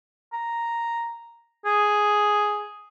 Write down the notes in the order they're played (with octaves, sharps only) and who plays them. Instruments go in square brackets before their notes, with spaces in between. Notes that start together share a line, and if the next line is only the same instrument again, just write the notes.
[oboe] A#5
G#4